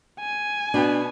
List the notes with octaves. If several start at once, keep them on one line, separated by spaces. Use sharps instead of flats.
G#5
B2 D4